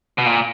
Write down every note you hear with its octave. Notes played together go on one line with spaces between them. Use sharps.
B2
A#2